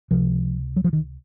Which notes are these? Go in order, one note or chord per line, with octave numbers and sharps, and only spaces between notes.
C#2 C3 F3
F#3
F3
D#3